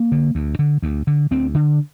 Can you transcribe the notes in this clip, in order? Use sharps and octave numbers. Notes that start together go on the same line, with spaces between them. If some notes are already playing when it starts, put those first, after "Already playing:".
Already playing: A#3
D3
D2
D3
D2
D3
D2 C4
D3